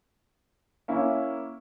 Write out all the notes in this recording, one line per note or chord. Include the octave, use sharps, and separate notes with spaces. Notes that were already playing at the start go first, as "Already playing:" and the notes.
A#3 C#4 E4